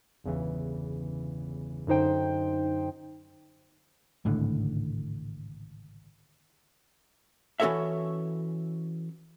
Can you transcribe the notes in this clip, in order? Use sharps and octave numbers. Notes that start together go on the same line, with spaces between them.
G1 E2 C#3 E3
F#2 D3 D#4 C5 G5
G#1 C#2 A2 D3
E3 C#4 F#4 A4 C#5 E5